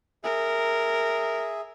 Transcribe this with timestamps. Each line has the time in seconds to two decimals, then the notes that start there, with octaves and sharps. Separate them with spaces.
0.24 G#4 A#4 E5